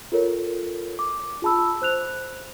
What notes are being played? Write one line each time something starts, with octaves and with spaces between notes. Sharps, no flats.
F4 A4 A#4 C#5
D6
F4 G#4 A5 B5 E6
C5 F#6 F7